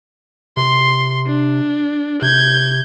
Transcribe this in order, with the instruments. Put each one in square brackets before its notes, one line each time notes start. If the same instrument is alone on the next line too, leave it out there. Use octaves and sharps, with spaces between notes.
[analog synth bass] C3 [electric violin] C6
[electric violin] D4
[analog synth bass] C3 [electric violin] G6 G#6